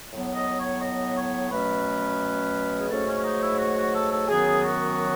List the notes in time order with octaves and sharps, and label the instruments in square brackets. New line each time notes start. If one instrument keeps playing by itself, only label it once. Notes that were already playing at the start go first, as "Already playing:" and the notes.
[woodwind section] A2 F#3 B3
D#5
C#5
D#5
C#5
B2 F#3 A3 C#4 B4
G#4
G#2 F#3 A3 C#4 A4
C#4
C#4
D#4
E4
F#4
F#4
A4
A4
F#2 D#3 F#3 B3 G#4
F#4